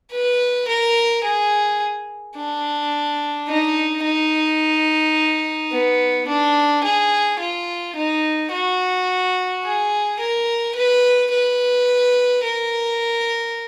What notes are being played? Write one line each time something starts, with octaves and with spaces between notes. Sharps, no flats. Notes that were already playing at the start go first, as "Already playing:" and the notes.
B4
A#4
G#4
D4
D#4
D#4
B3
D4
G#4
F4
D#4
F#4
G#4
A#4
B4
B4
A#4